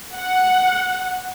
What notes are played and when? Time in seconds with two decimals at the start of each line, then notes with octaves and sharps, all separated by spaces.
0.16 F#5